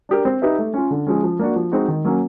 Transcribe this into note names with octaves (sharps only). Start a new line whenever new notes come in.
D4 G4 A#4
C4
D#4 G4 B4 E5
A3
C#4 F4
D3
F3 G#3 C#4
F3
A#3 D4 F#4
F3
G#3 C4 D#4 F#4
D#3
F#3 A#3 C#4